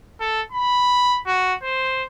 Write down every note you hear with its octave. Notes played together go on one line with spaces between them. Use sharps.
A4
B5
F#4
C5